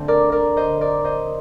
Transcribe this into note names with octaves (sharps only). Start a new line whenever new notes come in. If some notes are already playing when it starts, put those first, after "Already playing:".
Already playing: D3 A3 C4
A#4 D5
A#4 D5
C5 D#5
A#4 D5
C5 D#5